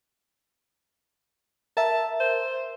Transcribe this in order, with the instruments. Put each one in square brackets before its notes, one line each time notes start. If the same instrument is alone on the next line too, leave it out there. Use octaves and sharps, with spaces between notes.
[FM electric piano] A#4 E5 [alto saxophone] A5
[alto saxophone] C5